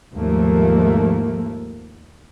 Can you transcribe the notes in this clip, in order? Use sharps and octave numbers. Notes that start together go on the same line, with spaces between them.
D#2 G#2 F3 A3 A#3